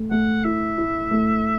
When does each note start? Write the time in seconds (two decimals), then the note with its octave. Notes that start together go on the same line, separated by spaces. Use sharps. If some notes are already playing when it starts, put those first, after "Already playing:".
Already playing: A3
0.11 A3 F#5
0.44 E4 E5
0.78 E4
1.11 A3